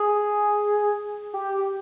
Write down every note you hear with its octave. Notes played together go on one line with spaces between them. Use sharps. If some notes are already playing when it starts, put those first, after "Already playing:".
Already playing: G#4
G4